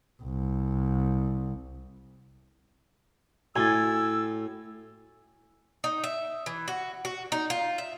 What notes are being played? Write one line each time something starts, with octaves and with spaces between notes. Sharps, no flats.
C2
A2 F#4 G#5 E6 G#6 A6
D#4
E5
E3
F#4
F#4
D#4
F4
E5